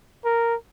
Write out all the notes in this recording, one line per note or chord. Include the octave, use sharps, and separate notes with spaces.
A#4